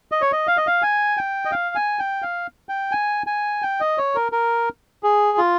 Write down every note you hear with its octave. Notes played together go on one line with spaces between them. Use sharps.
D#5
C#5
D#5
F5
D#5
F5
G#5
G5
D#5
F5
G#5
G5
F5
G5
G#5
G#5
G5
D#5
C#5
A#4
A#4
G#4
F4